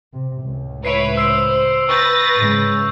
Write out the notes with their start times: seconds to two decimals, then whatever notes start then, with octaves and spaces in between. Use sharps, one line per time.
0.13 C3
0.44 C#2 A2
0.85 E4 B4 C#5 C7 D7 F7
1.17 C5 E6 C7 D7
1.89 B4 C#6 G6 A6 A#6
2.37 G#2 C#3 G#3